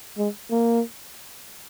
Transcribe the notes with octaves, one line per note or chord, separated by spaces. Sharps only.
G#3
A#3